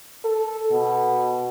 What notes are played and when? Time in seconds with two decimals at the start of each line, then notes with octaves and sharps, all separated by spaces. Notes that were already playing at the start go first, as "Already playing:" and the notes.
0.24 A4
0.72 B2